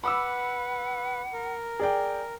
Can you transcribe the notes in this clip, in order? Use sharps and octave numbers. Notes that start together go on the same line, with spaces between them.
B4 F#5 B5 D6 E6
A#4
G#4 D5 G5